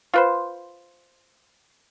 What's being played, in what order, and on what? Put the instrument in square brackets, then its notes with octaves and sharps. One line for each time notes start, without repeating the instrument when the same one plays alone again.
[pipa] F4 B4 C5